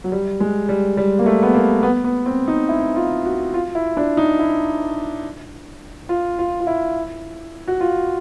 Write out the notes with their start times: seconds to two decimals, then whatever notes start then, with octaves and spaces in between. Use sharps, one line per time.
0.04 F#3
0.12 G3
0.40 G#3
0.69 G3
0.97 G3
1.19 A#3
1.26 A3
1.43 B3
1.54 A#3
1.83 B3
2.04 B3
2.26 C4
2.48 D#4
2.69 E4
2.96 F4
3.25 F#4
3.54 F4
3.75 E4
3.97 D4
4.17 D#4
4.39 E4
6.09 F4
6.39 F4
6.60 F4
6.67 E4
7.68 F#4
7.81 F4